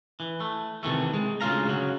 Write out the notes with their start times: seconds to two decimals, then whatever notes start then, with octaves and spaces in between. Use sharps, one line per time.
0.20 E3
0.40 A3
0.83 C3 D#3 E3 A3
1.14 G#3
1.41 D2 C#3 A#3 F4 F5 A#5
1.67 C#3 F#3